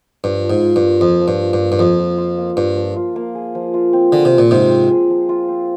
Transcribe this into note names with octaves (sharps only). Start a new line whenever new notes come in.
G2 F3
F3
G#2
F4
G2
A#3
F2 F3
F3
G2
F4
G2
A#3
G2
F2 F3
F3
F4
A#3
G2 F3
F3
F4
A#3
G#4
F3
F4
C4
D3 G#4
C3
F3
A#2
G#2 C3 F4
C4
G#4
F3
F4
C4